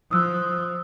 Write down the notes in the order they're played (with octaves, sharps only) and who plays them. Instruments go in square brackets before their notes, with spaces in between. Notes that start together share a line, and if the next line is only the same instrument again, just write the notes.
[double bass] F3 [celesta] D#6 E6 F#6